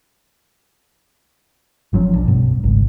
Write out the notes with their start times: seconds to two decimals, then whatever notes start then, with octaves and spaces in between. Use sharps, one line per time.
1.93 G1 F3 F#3 C#4
2.15 B1 D4
2.28 G2 B2
2.64 G#1 C#2